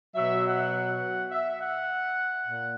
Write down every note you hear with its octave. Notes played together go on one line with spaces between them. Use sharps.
B2 F#3 E5
F#5
E5
F#5
A#2